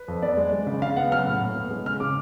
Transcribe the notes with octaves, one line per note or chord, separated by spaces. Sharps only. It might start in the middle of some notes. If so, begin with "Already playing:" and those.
Already playing: B4
F2
B3 D5
G#3
G#3
C#3
C#3 F5
B3 F#5
F#3 F6
A2
A2
B3
G#3
C#3 F6
C#3 D6